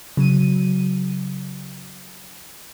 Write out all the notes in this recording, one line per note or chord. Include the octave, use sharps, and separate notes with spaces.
C#3 F#3 D#7